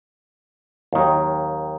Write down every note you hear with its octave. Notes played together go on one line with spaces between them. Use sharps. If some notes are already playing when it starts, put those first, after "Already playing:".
D#2 D#3 F#3